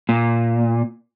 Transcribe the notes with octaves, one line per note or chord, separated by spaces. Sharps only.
A#2